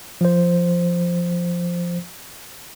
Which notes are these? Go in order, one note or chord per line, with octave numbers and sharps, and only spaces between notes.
F3 C5